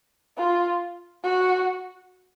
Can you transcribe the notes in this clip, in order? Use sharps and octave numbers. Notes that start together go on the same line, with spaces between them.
F4
F#4